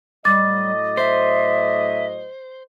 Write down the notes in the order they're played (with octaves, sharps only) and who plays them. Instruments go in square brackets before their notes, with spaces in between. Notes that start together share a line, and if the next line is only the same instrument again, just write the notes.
[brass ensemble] A2 F#3 D#5 [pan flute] G3 [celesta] D6 A6
[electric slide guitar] C5 [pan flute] E5